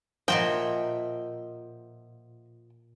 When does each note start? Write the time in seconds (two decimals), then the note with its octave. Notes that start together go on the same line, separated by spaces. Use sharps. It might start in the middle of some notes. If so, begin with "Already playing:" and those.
0.28 A#2 F3 F#4 D#5 E5 G5